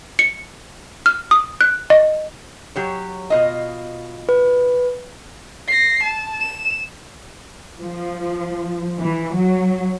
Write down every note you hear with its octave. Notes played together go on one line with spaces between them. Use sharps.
C#7
F6
D#6
F#6
D#5
F#3 G4 C#5
B2 F4 D#5
B4
A#6 C7
A5
E7
F3
E3
F#3